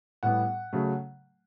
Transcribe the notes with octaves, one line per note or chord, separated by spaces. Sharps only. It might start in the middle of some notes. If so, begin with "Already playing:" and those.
A2 G3 B3 F#5
C#3 F#3 A3